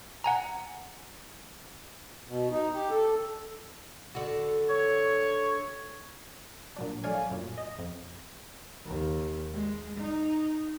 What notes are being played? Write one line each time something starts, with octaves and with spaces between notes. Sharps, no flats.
F#5 G#5 A#5
B2
D#4
G4
A4
D3 F#4
C#5
A#2 F#3 D4
F#3 A3 C#5 D5 F5 G#5
F#2 A#2
D#5
F2
D#2
G#3
D#4